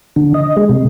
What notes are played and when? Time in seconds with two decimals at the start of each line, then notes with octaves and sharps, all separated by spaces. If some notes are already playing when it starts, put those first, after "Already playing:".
0.16 D3
0.34 D#5
0.57 G#3
0.70 C3